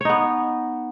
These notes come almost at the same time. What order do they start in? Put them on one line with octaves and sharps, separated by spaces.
C#5 D#4 B3